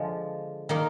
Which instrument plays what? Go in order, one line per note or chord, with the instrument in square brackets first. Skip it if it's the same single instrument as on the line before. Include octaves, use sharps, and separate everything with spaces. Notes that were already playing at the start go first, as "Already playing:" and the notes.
Already playing: [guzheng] D3 F3 G#3
D#3 A#3 D#4